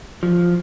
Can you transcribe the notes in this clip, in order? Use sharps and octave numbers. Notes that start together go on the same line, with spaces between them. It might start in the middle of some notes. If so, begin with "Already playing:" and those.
F3